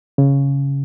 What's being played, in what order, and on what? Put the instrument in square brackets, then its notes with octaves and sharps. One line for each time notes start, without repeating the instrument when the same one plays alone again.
[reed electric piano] C#3